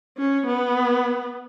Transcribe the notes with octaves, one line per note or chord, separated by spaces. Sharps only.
C#4
B3